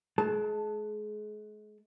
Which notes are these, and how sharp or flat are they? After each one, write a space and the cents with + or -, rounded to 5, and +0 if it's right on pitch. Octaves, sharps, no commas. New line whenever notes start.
G#3 +35 A5 +0